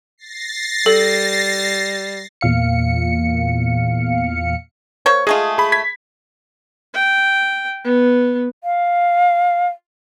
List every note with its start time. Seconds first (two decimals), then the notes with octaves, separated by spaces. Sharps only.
0.18 A6 A#6 C7
0.86 G3 A4
2.41 E2 A#2 F5 C#7
5.06 A#3 C5 C#5
5.27 G#3 A3 F4 G#4
5.58 G#4 B5
5.72 G#6 B6
6.93 G5
7.84 B3
8.62 F5